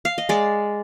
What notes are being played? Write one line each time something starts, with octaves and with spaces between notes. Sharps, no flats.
F5
D#5
G#3 D5